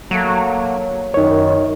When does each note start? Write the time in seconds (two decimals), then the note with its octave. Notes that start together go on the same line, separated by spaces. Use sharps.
0.11 F#3 A3 A#3
1.14 F#2 D#3 D#4 C#5